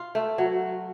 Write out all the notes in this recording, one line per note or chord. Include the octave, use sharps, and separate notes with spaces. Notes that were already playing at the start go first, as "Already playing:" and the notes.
Already playing: F4
A3
F#3